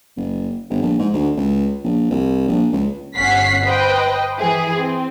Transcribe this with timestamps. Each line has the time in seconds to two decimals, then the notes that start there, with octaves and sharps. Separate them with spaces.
0.17 F#1
0.70 G1
0.82 A#1
0.99 G#2
1.14 D2
1.37 C#2
1.84 A#1
2.10 C2
2.48 A#1
2.73 C#2
3.16 G1 C#4 F#5 B6 C7
3.64 B4 C5 D#5 G5
4.39 E3 E4 G#4
4.76 C4